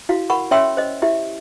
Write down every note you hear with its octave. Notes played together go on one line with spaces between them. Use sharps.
E4 F#4 F5
A#4 F#5 B5 C#6
C#4 C#5 E5 G5 C6 E6
C5 D#5
E4 G4 E5